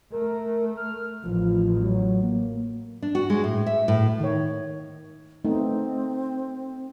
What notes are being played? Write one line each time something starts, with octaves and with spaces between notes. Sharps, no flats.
A3 A#4
F6
A1 F3
F#3
A#3
D4
F#4
G#3
A2
E5
A2
D#3 C#5
A3 B3 C4 D#4